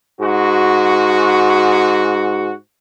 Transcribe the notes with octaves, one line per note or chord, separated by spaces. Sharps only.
G#2 F#4